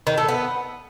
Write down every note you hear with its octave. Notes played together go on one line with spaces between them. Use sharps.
D#3
A3
B3